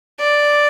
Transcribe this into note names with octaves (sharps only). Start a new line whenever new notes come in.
D5